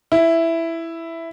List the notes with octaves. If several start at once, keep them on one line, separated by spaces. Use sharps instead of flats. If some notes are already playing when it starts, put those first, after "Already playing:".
E4